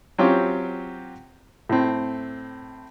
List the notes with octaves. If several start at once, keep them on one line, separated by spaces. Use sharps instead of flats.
F#3 C4 C#4 F4 G4
A2 C4